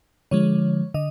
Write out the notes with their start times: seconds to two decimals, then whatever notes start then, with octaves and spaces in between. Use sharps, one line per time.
0.31 D3 F3 G#3 C#5
0.94 D3 D#5